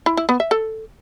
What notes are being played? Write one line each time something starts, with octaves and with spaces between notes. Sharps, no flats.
E4
E4
B3
E5
A4